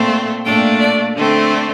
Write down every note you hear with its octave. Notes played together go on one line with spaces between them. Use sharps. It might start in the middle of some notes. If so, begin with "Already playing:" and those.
Already playing: A#2 A3 C4
A#2 A3 D4 G5
D5
D3 A3 C4